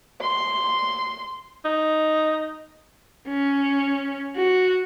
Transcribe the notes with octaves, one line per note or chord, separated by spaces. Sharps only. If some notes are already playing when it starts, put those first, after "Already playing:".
C6
D#4
C#4
F#4